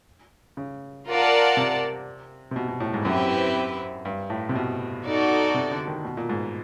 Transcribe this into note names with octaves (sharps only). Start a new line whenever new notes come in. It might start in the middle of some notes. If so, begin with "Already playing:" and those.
C#3
F4 A#4 D5 F#5 A5
C3
C3
B2
B2
A2
G#2
F#2 C4 E4 G4 B4 E5
G2
A2
C3
B2
D#4 F#4 A4 D5
C3
D3
D#3
B2
A#2
G#2